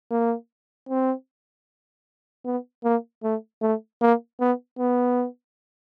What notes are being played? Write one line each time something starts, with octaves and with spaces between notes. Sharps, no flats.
A#3
C4
B3
A#3
A3
A3
A#3
B3
B3